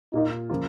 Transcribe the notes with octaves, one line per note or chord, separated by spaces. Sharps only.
A#2 A#3 D#4 F4
C#3 F3 A#3 F4